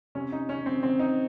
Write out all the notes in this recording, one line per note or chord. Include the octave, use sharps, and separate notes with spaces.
C3 C#4
D#4
C3 C#4
C4
C3 C4
D#4